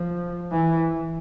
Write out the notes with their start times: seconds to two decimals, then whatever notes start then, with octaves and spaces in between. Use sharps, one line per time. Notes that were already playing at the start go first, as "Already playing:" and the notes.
Already playing: F3
0.51 E3